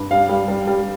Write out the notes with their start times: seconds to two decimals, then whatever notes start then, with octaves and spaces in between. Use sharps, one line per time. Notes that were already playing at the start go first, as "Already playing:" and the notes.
Already playing: G2
0.11 G3 F5
0.29 G3
0.48 G3
0.68 G3